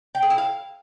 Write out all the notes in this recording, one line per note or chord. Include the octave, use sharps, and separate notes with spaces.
G5
G#4
E4
F5